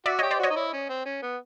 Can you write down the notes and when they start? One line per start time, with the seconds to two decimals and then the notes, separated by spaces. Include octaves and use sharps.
0.06 F#4 D5 E5
0.19 G4 C#5 D#5
0.31 C5 D5
0.40 F#4 C#5 D#5
0.50 D#4
0.56 E4
0.73 C#4
0.89 C4
1.05 C#4
1.22 B3